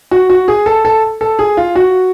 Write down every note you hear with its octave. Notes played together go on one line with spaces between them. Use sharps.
F#4
F#4
G#4
A4
A4
A4
G#4
F4
F#4